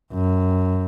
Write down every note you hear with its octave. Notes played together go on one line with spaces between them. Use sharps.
F#2